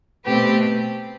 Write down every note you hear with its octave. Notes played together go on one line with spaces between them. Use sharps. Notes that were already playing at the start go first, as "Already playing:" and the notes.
B2 A3 C4 G4 B4